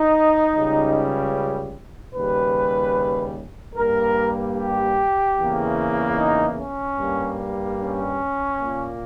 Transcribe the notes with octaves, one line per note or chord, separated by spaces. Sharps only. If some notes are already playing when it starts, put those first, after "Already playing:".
Already playing: D#4
C#2 C#3 G3
D#2 C#3 G3 B4
G2 G3 A#3 A#4
G4
E2 C#3 E3 A#3
D#4
C#4
G2 G3 A#3
C#4
A#2 A#3